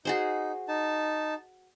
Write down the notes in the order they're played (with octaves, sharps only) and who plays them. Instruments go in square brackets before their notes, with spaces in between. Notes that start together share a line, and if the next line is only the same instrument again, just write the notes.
[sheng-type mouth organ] D#4 [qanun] F#4 G#4 C5
[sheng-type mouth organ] D#4 A5